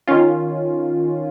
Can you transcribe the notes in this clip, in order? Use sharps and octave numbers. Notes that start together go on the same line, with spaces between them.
D#3 C#4 F4